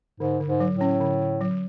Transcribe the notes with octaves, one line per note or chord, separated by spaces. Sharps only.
G#2 D3
D3
G#2
F#3
A2
C#4
D3
D3
F#3